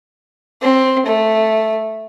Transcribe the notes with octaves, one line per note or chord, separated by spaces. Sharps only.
C4
A3